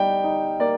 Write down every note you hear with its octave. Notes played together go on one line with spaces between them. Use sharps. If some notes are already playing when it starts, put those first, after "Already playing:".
Already playing: G3 D#4 G5
D#4
A#3 D5